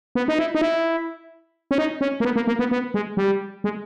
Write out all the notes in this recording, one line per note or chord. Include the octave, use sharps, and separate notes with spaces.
B3
D#4
E4
D#4
E4
C#4
D#4
C#4
A#3
B3
A#3
A#3
B3
B3
G#3
G3
G#3